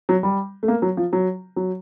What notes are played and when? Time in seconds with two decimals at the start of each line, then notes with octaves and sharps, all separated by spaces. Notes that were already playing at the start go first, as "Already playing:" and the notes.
0.09 F#3
0.23 G3
0.63 A3
0.68 A#3
0.82 F#3
0.97 F3
1.13 F#3
1.56 F#3